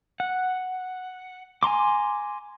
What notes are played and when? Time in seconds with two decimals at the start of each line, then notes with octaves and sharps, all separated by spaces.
0.20 F#5
1.63 G#5 A#5 C6 D6